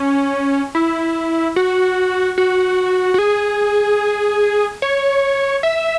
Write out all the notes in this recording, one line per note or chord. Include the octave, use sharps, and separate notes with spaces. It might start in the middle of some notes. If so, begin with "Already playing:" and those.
Already playing: C#4
E4
F#4
F#4
F#4
G#4
C#5
E5